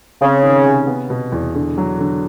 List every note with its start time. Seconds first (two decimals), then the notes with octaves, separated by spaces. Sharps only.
0.21 C#3 C4
0.43 D#3
0.66 C3
0.87 B3
1.10 B2
1.32 E2
1.55 D3
1.78 F#3
1.99 D3